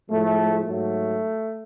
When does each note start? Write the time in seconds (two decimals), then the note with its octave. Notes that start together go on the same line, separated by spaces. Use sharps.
0.10 A2 F3 G#3 A3
0.64 G#2 F#3 A3